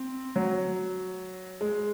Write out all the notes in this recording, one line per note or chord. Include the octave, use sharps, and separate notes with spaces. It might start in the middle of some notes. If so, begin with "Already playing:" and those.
Already playing: C4
F#3
G#3